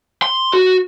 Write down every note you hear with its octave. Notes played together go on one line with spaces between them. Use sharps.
C6
F#4